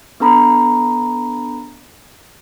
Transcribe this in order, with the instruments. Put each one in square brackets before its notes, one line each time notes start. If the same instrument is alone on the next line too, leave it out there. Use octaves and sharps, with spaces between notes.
[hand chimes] B3 D4 A4 A#5 B5